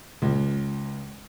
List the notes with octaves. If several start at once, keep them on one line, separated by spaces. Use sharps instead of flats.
C#2